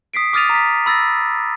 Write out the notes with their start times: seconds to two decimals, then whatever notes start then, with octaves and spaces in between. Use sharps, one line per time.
0.14 D#6 B6 C7 D7
0.33 D6 D#6 F6 A6 D#7 F7
0.50 A#5 B6
0.86 B5 E6 A6 A#6